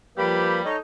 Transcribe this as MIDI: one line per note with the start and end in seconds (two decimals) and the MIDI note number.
0.18 0.61 53
0.18 0.69 55
0.18 0.61 58
0.18 0.58 67
0.18 0.61 71
0.18 0.61 83
0.65 0.78 63
0.65 0.79 69
0.65 0.76 73
0.65 0.76 75